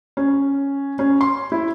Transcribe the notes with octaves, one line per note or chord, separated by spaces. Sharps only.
C#4
C#4
C6
E4